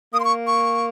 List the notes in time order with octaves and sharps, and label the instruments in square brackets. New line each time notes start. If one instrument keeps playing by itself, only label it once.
[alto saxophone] A#3 [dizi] D#6
[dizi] C6
C#6
C#6